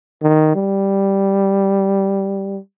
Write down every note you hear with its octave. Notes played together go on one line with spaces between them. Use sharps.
D#3
G3